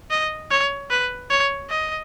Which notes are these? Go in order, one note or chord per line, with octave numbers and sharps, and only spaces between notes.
D#5
C#5
B4
C#5
D#5